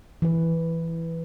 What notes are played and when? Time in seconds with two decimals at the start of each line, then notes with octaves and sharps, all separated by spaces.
0.22 E3 B4